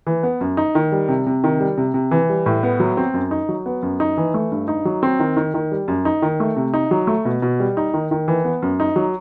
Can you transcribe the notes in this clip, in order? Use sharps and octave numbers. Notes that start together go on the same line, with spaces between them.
E3
B3
F#2
D#4
D#3
G3
C3
C3
D#3
G3
C3
C3
E3
G3
A2
B3
F#3
C4
F#2
D#4
F#3
B3
F#2
D#4
E3
A3
G2
D#4
F#3
C4
D#3
D#3
D#3
G3
F#2
D#4
D#3
A3
C3
D#4
F#3
A3
B2
B2
G3
D#4
D#3
D#3
E3
B3
F#2
D#4
F#3